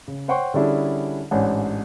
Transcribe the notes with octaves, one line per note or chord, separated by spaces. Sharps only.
C#3
C5 C#5 F#5 G5 C6 C#6
D3 G3 C#4 D4 E4 G#4
A1 G#2 D4 F#5